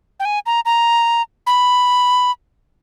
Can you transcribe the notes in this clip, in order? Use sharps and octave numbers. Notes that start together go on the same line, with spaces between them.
G5
G#5
A#5
A#5
B5